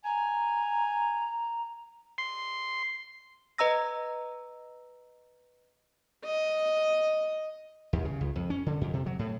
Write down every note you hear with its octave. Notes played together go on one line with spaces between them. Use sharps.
G#5 A#5
C6
B4 D#5 A#5 E6 A#6
D#5
D#2
C#3
C#2
F2
C#4
D3
F2
C3
F#3
A2